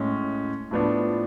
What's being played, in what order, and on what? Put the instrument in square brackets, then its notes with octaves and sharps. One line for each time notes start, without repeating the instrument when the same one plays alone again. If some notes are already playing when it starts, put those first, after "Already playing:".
Already playing: [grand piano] A2 G#3 C#4
A2 F3 B3 D4